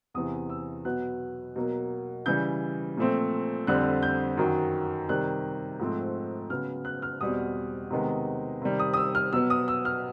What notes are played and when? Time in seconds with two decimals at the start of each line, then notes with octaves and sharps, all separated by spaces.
0.14 E2 C3 E3 D#6
0.50 E6
0.84 B2 F#3 B3 F#6
1.56 B2 F#3 A#3
2.26 C#3 E3 G3 G6
2.97 A#2 F3 A3 C4
3.67 F2 D3 G3 C4 F#6
4.03 G6
4.38 F#2 D#3 F#3
5.08 C3 D#3 G3 F#6
5.79 G#2 F3 A3 C4
6.50 C#3 F#3 B3 F6
6.85 F#6
7.02 F6
7.21 E2 B2 G3 C4 D#6
7.91 C3 D#3 G#3 B3
8.62 C3 D#3 G3
8.80 D#6
8.94 D#6
8.97 E6
9.15 F6
9.33 B2 F#3 B3 E6
9.50 D#6
9.68 E6
9.85 F6